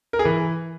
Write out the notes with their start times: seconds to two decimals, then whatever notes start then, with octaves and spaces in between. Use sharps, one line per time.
0.13 A#4
0.19 G#4
0.25 E3